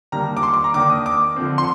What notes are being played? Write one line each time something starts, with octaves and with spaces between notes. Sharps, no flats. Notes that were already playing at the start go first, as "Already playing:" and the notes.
D#3 G3 A#3 D4 A#5
D6
C6
D6
A#5
D#3 A#3 D4 D6
D#6
D6
D3 F3 C4
C6